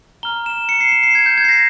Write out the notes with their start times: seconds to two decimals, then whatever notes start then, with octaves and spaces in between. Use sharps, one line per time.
0.23 A#5 F6 G7
0.46 E7
0.69 C#7
0.81 C7
0.92 E7
1.03 C7
1.15 G#6
1.26 G6
1.37 G#6
1.44 C7
1.49 A#6